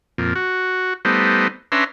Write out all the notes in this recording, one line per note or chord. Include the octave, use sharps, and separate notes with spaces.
F2 A#2
F#4
G3 A3 B3 D#4 C5
C#4 D4 B4 E5 A#5 C6